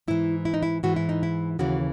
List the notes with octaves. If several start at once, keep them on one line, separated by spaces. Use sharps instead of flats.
G#2 E3 E4
E4
D#4
E4
G#2 E3 F#4
E4
D#4
E4
D#2 C#3 E3 F#4